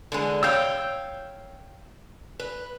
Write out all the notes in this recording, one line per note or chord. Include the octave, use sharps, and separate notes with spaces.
D3 E3 G#3
C#5 F5 G5 E6 G6
B4